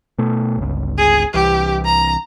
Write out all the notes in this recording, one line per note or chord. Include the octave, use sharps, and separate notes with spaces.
B2 A3
G1 C#2
G#4
C2 E3 G4
A#5